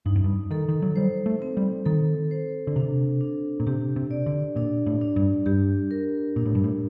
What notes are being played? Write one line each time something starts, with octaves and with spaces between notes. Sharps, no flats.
G2 D#4
F#2
G2
D#3 A4
D#3
F#3
G3 C5
A3
C4
G3
D#3 A4
C5
D3
C3 D4
D4
A#2
C3 G4
C3
D5
D3
A#2 D4
A2
D4
G2
G2 G4
A#4
A#2 D4
A2
G2
A2